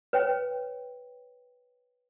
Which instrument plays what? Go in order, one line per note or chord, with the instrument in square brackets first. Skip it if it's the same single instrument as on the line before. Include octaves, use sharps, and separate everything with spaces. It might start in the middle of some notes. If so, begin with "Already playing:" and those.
[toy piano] B4 C#5 G5